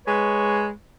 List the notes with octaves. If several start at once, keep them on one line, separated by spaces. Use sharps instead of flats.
G#3 B4 C#5